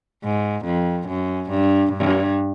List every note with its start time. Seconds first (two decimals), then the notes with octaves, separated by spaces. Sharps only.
0.23 G#2
0.65 F2
1.08 F#2
1.50 G2
1.93 G2